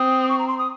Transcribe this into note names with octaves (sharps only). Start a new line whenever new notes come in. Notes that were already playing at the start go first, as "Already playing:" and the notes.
Already playing: C4 D#6
C#6
A#5
C6
D#6